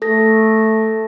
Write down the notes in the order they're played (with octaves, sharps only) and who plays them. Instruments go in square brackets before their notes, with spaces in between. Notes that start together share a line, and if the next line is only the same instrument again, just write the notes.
[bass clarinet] A3 [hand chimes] A4 A#6